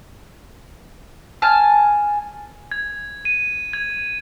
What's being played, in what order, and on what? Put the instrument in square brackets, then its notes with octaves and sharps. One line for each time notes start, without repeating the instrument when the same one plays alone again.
[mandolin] G#5 A5 F6
[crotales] G#6
D#7
G#6